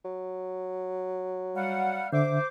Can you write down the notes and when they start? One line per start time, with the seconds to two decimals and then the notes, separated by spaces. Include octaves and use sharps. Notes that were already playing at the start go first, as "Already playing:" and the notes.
0.05 F#3
1.56 G3 F5 F#5
2.13 D3 C5 E5 D6